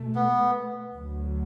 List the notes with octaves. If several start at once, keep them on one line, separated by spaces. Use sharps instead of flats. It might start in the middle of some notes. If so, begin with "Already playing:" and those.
Already playing: B2 A3
B3
D2 D3 F#3